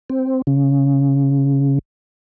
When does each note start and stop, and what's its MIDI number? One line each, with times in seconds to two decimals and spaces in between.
0.10 0.42 60
0.47 1.79 49